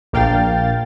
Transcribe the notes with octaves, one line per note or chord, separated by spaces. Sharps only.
A#1 A#3 F5 G5 A6